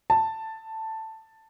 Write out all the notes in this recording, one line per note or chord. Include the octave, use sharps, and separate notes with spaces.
A5